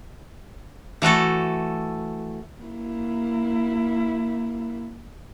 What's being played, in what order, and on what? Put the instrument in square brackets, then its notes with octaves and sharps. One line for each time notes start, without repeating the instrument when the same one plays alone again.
[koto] E3 A3 F#4 A4
[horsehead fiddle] A#3 E4